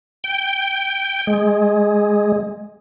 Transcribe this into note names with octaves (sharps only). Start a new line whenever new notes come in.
G5
G#3